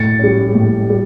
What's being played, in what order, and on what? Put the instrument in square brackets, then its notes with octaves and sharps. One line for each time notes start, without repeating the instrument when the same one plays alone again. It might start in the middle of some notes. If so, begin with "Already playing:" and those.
Already playing: [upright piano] A2 A6 C#7
G3 C#4
A2
G3